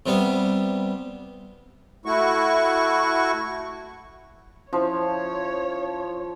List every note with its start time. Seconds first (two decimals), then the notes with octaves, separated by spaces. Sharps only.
0.06 C3 G3 B3
2.06 A3 E4 F#4 C#6
4.73 F3 C#4 E4 C5 C#5